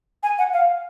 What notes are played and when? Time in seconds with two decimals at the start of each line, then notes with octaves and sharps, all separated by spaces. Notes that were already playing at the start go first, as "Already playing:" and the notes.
0.23 G#5
0.38 F#5
0.53 F5